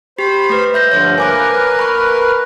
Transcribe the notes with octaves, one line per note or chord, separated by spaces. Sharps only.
G4 C5 B5
A3 B4
E5 G6 A#6
G2 D3 F3 C5 C#5
A#3 A#4 B4 G#5 D6 A#6
B5 C#6 F#6